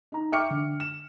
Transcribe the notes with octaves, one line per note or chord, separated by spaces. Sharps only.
D#4 A#5
E5 G5 C#6 D6 F6 C#7
D3
E7